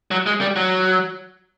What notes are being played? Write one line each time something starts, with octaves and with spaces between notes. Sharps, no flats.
F#3
G#3
G3
F#3